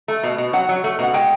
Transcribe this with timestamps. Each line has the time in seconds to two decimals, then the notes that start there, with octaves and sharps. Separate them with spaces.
0.08 A3
0.23 B2
0.38 B2
0.53 F#3 F#5
0.69 F#3
0.84 A3
0.99 B2 F#5
1.14 G#3 G5